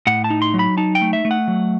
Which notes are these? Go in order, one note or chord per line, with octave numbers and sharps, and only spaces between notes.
A2 F#5
A5
D#4
C6
F#3
B5
D#4 A5
G5
A3
E5
A3
F#5
F#3